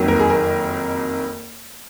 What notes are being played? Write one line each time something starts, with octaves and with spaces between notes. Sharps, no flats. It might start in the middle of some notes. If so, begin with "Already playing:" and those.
Already playing: F#1 F2 D#3 F#3 A#3
A#4
G#4
A#4